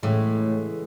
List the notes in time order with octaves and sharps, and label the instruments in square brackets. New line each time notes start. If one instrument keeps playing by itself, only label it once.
[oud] A2 [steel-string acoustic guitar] C#3 E3 G#3 B3